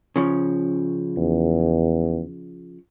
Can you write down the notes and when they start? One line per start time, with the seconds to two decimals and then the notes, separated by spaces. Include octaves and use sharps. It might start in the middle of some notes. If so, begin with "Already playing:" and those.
0.16 C#3 F3 C#4
1.17 E2